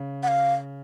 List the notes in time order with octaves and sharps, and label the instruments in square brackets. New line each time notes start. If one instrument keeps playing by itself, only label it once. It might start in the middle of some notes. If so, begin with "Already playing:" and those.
Already playing: [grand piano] C#3
[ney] F#5
F5